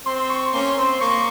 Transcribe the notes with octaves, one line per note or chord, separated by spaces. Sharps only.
C4 C6
C#6
A#3 C#4 C6
C4
A#3 C#6